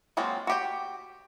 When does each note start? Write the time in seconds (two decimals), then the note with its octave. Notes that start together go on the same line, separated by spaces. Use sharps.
0.17 F#3 G#3 A#3 C4 F4
0.47 F#4 G4 G5